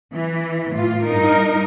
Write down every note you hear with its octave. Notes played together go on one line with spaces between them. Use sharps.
E3
A2 F4
G2 D#4 A#4